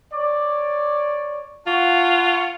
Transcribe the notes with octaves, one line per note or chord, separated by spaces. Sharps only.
C#5 D5
F4 F#5 A5 C#6